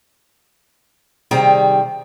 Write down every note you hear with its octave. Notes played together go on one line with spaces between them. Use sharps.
C3 D#3 G3 G#4 G5 A#5